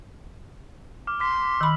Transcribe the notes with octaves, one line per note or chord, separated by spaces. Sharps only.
D6 F6
C6 D6 B6
D#3 B5 E6 F#7